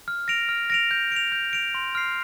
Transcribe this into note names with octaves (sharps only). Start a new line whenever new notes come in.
F6
A#6 D7 F7
F6
A#6 D7 F7
G6
D7 F7
G6
D7 F7
C6
F6 C7